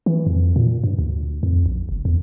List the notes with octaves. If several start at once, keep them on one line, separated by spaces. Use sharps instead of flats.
E3
F2
A#2
G2
D2
F2
A#1
F#1
E2